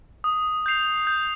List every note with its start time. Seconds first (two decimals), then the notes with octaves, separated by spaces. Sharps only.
0.24 D#6
0.66 G6 C7 F7
1.07 G6